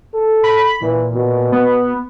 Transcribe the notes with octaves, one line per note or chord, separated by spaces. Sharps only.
A4
B5
A#2 E3
B2
B3